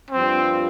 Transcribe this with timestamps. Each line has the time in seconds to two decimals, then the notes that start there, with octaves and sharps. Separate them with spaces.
0.11 G2 F3 C4